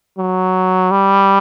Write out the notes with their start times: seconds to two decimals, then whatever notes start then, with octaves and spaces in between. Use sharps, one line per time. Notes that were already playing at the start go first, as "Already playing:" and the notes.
0.18 F#3
0.91 G3